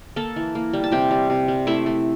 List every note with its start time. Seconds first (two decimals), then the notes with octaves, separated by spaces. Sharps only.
0.16 A#3 A4 A5
0.36 E3
0.55 A#3
0.73 G3
0.84 A5
0.91 C3 G4 G5
1.11 G3
1.30 C3
1.48 G3
1.67 A3 E4 E5
1.86 A3